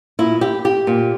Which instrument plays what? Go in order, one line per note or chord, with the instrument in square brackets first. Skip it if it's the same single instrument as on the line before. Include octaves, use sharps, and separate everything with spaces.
[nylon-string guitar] A#2 E4
G4
G4
A#2